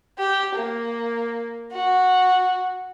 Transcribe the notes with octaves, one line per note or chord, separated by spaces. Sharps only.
G4
A#3
F#4